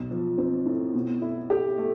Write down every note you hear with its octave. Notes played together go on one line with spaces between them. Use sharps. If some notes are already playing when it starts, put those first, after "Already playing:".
Already playing: B1
F3
C4
A2
B2
E4
G4
A3